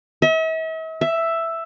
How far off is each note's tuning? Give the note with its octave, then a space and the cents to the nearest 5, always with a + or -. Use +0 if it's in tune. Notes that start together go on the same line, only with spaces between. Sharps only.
E5 -45
E5 +5